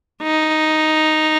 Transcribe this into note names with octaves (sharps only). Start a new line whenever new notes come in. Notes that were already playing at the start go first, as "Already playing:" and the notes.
D#4